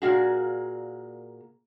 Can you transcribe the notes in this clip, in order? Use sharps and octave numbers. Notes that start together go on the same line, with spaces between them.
A#2 A#3 F#4 G#4